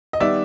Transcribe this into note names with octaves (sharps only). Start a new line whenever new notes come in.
D#5
D#3 G3 B3 D5 E5